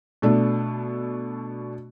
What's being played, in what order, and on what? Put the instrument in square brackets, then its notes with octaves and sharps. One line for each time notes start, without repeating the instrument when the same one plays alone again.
[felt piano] B2 A3 D4